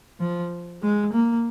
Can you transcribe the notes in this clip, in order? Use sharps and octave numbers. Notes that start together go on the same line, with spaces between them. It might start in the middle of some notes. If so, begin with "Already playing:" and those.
F3
G#3
A#3